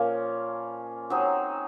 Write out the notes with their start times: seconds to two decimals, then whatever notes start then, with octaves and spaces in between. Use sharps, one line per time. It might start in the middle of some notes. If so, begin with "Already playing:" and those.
Already playing: A#2 F3 A#3 C#4
1.10 F#3 C4 D#4 G#4